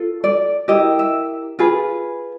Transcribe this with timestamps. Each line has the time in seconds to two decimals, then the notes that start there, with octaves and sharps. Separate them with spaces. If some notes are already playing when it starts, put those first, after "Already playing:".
Already playing: F4 A4
0.24 D5
0.68 E4 G4 A#4 D#5
0.99 E5
1.59 F4 G#4 B4